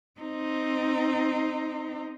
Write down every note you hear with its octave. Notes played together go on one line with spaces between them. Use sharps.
C4 D#4